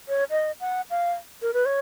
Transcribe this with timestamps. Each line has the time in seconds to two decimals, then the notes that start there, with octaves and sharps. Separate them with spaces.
0.08 C#5
0.31 D#5
0.60 F#5
0.90 F5
1.42 A#4
1.54 B4
1.66 C#5